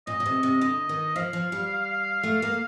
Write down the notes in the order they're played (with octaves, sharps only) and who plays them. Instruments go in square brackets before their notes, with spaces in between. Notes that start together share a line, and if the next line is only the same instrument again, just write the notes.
[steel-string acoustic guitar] A#2 [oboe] D#5
[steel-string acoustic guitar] A#2
C3
C3
[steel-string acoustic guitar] D3 [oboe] D#5
[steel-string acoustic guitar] D#3
[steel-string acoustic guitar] F3 [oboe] F5
[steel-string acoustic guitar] F3
G3
A3
A#3